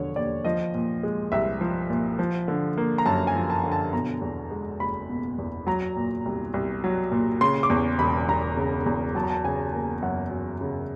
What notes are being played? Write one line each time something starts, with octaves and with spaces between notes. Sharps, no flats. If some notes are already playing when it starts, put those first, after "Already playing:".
Already playing: E1 D3 F3 C#5
D#2 D5
F3 D#5
A#2
G#3
C2 E5
F3
A#2
F3
D3
A#3
A#5
F#2 A5
G#5
F3
A5
D3
A5
B2 A#5
E2
G#3
F#1 B5
B2
E2
F#3 A#5
A#2
C2
C2
F#3
A#2
C#3 C6
D6
E2 C#6
E1 B5
E1 A#5
C#3
E2
F#3 A5
A#5
A5
C#3 G#5
A#3
F#2 F#5
F#3
C#3